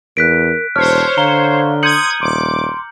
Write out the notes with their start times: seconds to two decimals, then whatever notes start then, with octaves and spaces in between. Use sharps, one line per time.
0.17 E2 A#4 F#6 B6 D7
0.76 E1 C5 C#5 A5 F6
1.18 D3 F5 A#5 G7
1.83 C6 D#6 G6 G#6 C#7 F#7
2.21 D#1 C6 D6